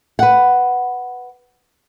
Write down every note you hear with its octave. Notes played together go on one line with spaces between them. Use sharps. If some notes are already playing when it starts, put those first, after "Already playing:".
B4 F#5